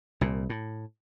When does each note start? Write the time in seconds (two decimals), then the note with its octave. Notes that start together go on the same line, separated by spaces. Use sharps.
0.21 C2 A#2
0.50 A2